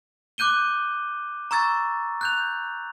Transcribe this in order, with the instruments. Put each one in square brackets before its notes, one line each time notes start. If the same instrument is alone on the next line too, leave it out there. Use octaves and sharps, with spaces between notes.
[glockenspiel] D6 F#6 G6 D#7 G7
A#5 C#6 E6 G#6 A6
F#6 G6 F7